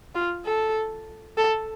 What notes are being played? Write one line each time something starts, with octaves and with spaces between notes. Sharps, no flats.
F4
A4
A4